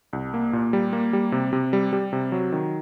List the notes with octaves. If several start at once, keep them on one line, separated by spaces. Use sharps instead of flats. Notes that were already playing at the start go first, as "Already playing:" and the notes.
C2
A#3
A#2
G3
A#3
G3
C3
C3
G3
G3
C3
F#3
D#3